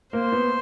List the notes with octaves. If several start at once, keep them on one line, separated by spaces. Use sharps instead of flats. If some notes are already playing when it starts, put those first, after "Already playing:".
A#3 C5
B3